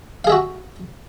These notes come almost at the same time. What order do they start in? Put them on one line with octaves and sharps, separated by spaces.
F5 G#4 E5 F#4